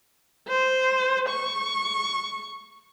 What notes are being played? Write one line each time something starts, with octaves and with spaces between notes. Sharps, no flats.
C5
C#6